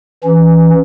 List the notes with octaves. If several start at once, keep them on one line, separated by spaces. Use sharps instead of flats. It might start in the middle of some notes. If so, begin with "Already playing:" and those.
E3 C#4